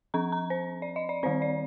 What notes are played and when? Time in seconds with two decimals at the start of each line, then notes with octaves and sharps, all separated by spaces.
0.14 F3 C4 A#5
0.32 A#5
0.50 C5
0.82 D5
0.96 D#5
1.09 D5
1.23 D#3 G3 C4 C5
1.42 D5